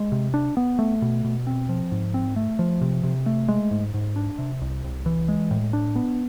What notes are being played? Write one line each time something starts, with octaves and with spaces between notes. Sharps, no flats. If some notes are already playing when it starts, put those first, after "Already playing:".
Already playing: G#3
C3
D4
B3
A3
B2
B2
C4
F3
G#2
C4
A3
F3
C3
C3
A3
G#3
G#2
G#2
D4
C3
C2
C2
E3
G#3
A2
D4
B3